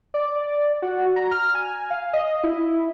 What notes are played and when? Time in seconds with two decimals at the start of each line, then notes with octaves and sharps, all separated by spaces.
0.14 D5
0.82 F#4
1.16 A#5
1.31 F6
1.55 G#5
1.90 F5
2.13 D#5
2.44 E4